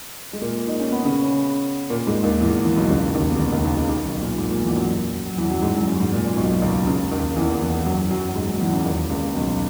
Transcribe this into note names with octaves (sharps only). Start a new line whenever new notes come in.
G#3
A#2 A#3
D#4
C#4
B3
C#3 C#4
A#2 A#3
G#2 G#3
D#2 D#3
E2 E3
E2 E3
B1 B2
C#2 C#3
D#2 D#3
B2
C#2 C#3
D#2 D#3
D#2 D#3
C#2 C#3
D#2 D#3
B1 B2
A#2
G#2
A#2
E2 E3
F#2 F#3
F#3
E2 E3
F#2 F#3
G#2 G#3
F#2 F#3
F#2 F#3
G#2
A#2
A#2
B1 B2
C#2 C#3
C#2 C#3
D#2 D#3
E2 E3
E2 E3
F#2 F#3
F#2 F#3
F#3
G#2 G#3
F#2 F#3
E2 E3
C#2 C#3
D#2 D#3
C#2 C#3
B1 B2